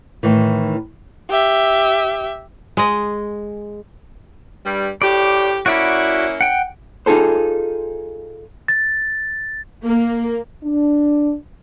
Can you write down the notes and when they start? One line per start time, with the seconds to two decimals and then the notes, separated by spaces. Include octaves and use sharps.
0.23 A2 D#3 E3
1.30 G4 E5
2.77 G#3 D#5
4.64 G2 G3
5.02 A2 G4 D5
5.66 A#3 C#4 E4 F#4 D5 B5
6.41 F#5 G5
7.06 D#4 F4 G#4 A4 C5
8.68 A6
9.85 A#3
10.64 D4